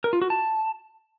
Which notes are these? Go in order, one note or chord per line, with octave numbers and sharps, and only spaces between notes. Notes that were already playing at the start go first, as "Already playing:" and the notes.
A#4
F4
F#4
A5